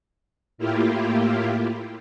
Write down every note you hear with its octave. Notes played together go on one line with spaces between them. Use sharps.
A2 A#3 E4 F4 G4